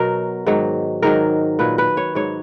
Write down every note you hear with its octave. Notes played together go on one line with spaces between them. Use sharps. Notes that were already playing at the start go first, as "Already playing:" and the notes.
Already playing: B2 F#3 A#4
G#2 D#3 F#3
G#2 D#3 F#3 A#4
A#2 F#3 B4
B4
C#5
G#2 F#3 C#5